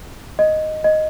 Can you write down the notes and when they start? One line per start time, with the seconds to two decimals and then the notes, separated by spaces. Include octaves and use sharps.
0.39 D#5
0.84 D#5